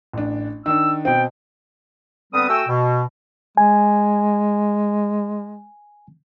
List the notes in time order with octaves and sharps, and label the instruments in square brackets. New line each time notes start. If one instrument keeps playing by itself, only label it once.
[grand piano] A1 D4
[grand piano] D#3 D4 [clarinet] E6
[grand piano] B2 C4 [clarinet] G5
[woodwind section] D3 G3 B3 C4 B4 D#6
A3 F#4 G5 G#5 E6
B2
[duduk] G#3 [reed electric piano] G#5